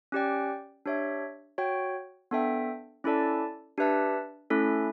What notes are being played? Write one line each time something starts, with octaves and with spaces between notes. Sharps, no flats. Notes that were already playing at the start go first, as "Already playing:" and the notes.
C#4 G4 D5 G5
D4 G4 C#5 E5
F#4 C#5 G5
B3 D4 A4 E5 G5
C#4 E4 A4 D5 A5
D4 G4 B4 E5 A5
A3 C#4 E4 A4